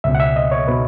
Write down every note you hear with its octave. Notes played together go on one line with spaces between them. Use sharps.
C#2 B2 E5
F#5
E5
D#5
C#5
B2 B4